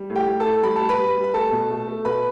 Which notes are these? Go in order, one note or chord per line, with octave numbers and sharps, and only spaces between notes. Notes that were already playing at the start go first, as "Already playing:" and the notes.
Already playing: G3
A2
G4 G5
A2
A4 A5
A2
G3 B5
A5
G3
B4 B5
G3
G3
B5
A3 A4 A5
B2
A3
A3
B2 B4 B5